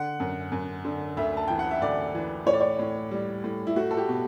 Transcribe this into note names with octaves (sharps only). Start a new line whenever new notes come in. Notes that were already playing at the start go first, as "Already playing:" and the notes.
Already playing: D3 F#5
F#2
F#2
D3
D2 E5
A5
E3 G5
F#5
E5
D2 D5
E3
A2 C#5
D5
C#5
A2
G3
A2
E4
A3 F#4
A4
G4
B2